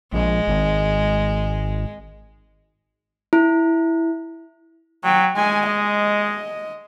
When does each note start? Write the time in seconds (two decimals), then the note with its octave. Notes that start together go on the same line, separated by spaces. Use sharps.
0.13 A#1 G#3
0.48 G#1
3.33 E4
5.04 F#3 G5
5.36 G#3 G#5
5.67 D#5